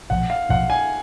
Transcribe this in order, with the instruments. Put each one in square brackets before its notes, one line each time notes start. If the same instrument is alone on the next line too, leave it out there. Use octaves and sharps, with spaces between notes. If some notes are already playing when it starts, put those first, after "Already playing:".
[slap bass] B1 A#2 F3 [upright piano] F#5
[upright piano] F5
[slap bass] B1 A#2 F3 [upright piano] F#5
[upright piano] G#5